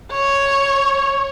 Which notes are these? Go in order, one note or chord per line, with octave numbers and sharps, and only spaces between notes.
C#5